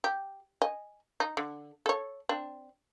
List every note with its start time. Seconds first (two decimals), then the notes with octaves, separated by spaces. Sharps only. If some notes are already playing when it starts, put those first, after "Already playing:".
0.04 G4
0.62 D#5 G#5
1.20 D#4
1.37 D3
1.86 A4 C#5
2.29 C4 D4